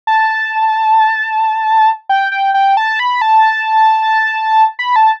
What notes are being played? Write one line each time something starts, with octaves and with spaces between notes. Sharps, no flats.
A5
G5
G5
G5
A5
B5
A5
B5
A5